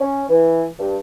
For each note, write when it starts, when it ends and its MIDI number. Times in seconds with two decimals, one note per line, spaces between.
0.01 0.23 61
0.30 0.65 52
0.79 0.97 43